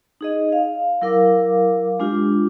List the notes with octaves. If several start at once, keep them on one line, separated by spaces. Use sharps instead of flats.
D#4 G#4 D#5
F5
F#3 E4 A#4 F5 D6
G#3 D4 F4 G4